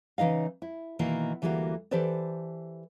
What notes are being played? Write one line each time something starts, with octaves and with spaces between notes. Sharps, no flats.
C#3 E3 D#4 D#5 F5
E4
B2 D#3 E3 A#3
D2 E3 G3 G#3 A#3 F#4
E3 G4 A4 B4 C5 D5